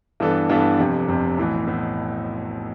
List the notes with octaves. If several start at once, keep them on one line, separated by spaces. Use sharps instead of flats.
G2 E3 B3 D4 A4
G2 E3 B3 D4 A4
F1 F2 C3
F1 F2 C3
B1 A2 E3 B3
A2 E3 B3